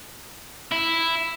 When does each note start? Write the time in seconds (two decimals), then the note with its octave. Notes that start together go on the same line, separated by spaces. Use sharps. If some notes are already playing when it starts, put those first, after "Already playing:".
0.72 E4